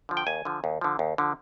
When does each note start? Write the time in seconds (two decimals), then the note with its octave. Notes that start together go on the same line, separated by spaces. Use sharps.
0.09 D3 F3
0.17 G5
0.27 D#2 G#5
0.45 D3 F3
0.64 D#2
0.81 D3 F3
0.99 D#2
1.18 D3 F3